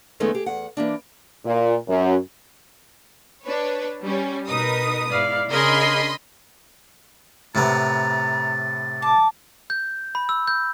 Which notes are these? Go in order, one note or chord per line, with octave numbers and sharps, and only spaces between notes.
F2 D#3 G#3 A3 B3 C#4
G4 G#4
E2 F#5
E3 A#3 D4
A#2
F#2
D4 B4 C#5
G3 C#4
B2 D#4 A#4 B4 D#6
G#2 E4 D5 F5
C#3 D4 G#4 A#4 D#5 B5 C6
A2 C3 B3 A#5 A6
A5 D6
G6
B5
E6
G6